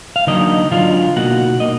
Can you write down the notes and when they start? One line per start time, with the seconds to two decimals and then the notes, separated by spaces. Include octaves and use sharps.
0.16 F5
0.27 D3 F#3 A#3 D4 D#4 D#5
0.71 D3 F#3 A#3 D4 F4 F5
1.16 B2 A#3 D#4 F#4 F#5
1.60 B2 A#3 D#4 D#5